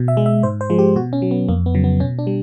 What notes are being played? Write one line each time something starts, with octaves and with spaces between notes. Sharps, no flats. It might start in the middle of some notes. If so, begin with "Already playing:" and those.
Already playing: B2
E5
G#3
E5
G#2 C5
C5
F3 G#3
G4
B2 F#4
C#4
F#3
B3
F2 A#3
B3
C#3 F#3
B3
B2 C#4
D4
G3